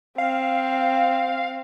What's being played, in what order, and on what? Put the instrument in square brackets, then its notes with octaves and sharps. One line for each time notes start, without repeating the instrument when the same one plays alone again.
[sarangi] C4 [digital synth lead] F5